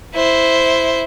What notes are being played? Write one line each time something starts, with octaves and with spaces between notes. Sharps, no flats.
E4 C5